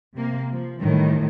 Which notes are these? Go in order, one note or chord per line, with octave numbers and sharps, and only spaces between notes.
C3 A#3
F3
A2 D#3 E3 G3